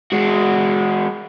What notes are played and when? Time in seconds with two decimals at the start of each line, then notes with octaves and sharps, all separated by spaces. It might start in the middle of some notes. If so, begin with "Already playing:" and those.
0.12 G#3 F#4